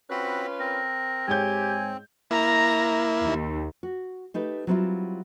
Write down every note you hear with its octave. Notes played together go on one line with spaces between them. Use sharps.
C4 C#4 F4 F#4 B4 B5
C4 A#4
G#2 G4 C#5 G#5 G6
A#3 E4 A#5
D#2
F#4
A3 D#4 G4 B4
F#3 G3 B3 C4 E4 F4